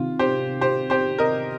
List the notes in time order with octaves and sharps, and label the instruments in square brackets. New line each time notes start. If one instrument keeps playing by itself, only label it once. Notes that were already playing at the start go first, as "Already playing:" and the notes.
Already playing: [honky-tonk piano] C3 D#3 C4 [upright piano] F4
[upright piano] G4 C5
G4 C5
G4 C5
A#4 D#5